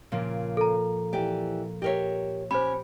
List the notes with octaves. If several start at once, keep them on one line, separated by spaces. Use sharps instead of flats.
A#2 C#3 F3 A#3
A4 A#5
E3 G4 D5
G4 A#4 C#5 D#5 E5
C#4 G4 C5 B5